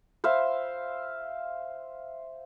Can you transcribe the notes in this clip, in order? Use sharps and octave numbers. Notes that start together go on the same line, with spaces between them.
C5 E5 F5